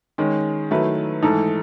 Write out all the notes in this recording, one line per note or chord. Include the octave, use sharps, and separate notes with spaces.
D#3 G#3 C#4
D#3 F#3 A3 E4 B4
G#2 E3 A3 D#4 A4